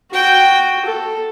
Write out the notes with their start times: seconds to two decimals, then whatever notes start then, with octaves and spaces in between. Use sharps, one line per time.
0.13 F#4 G5
0.86 A4